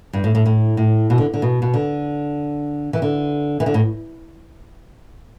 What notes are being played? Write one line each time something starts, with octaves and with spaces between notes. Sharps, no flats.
G2
A2
A2
A2
A2
B2
D3
D3
B2
B2
D3
E3
D3
E3
D3
A2